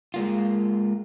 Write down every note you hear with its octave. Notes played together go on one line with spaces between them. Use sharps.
G#3 A#3 F4